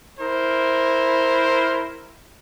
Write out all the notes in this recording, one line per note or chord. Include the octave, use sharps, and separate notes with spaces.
E4 A#4 C5